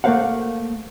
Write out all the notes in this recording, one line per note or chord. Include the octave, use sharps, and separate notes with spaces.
A3 A#3 A#4 C5 F5 F#5